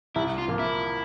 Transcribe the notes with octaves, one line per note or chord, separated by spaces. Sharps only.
C2 E4
F4
A#2 F3 A#3
E4